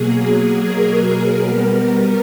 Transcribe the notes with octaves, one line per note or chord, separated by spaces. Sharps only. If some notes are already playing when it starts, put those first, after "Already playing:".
Already playing: B2 F#3 A#3 G#4
A#4
B2 G3 B3